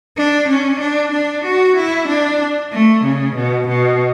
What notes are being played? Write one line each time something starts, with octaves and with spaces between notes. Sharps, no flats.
D4
C#4
D4
D4
F#4
E4
D4
A3
C#3
B2
B2